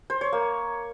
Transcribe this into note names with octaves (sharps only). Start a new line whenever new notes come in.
C5
C#5
A#3